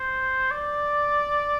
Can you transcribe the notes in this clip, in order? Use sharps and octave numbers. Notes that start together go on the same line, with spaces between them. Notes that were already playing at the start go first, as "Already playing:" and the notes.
Already playing: C5
D5